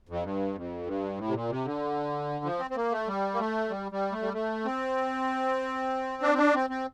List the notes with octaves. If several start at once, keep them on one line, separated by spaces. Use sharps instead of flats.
F2
G2
F2
G2
A2
C3
A#2
C3
D3
F3
C4
C4
A#3
A3
G3
A#3
A3
G3
G3
A3
G3
A3
C4
D4
C4
D4
C4
C4